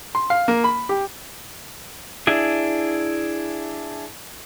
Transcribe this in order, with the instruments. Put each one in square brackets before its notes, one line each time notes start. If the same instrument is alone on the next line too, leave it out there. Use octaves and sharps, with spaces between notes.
[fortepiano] C6
F5
A#3
B5
G4
[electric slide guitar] D4 E4 G#4